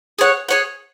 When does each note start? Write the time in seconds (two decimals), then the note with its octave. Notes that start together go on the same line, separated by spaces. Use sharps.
0.19 G#4 C#5 F#5
0.49 G#4 C#5 F#5